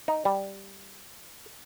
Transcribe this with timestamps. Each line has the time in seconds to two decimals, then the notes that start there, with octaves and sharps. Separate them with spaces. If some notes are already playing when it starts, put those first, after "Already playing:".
0.08 D#4
0.25 G3